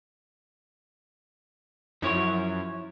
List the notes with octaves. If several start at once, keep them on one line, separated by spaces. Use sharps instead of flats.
F#2 F3 E4 C#5